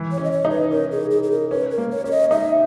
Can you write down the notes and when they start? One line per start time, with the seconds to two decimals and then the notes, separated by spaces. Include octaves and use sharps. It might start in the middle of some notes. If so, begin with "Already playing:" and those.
Already playing: E3
0.12 C#5
0.18 C#4
0.24 D#5
0.32 C#5
0.45 D#4
0.51 B4
0.71 C#4 A#4
0.92 G#4
1.11 G#4
1.23 G#4
1.31 A#4
1.51 C#4 B4
1.71 A#4
1.78 A#3
1.91 C#5
2.04 C#4 C#5
2.11 D#5
2.31 D#4 E5